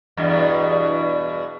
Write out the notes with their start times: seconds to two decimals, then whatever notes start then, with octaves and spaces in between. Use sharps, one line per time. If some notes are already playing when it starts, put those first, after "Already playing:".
0.17 E2 G2 B2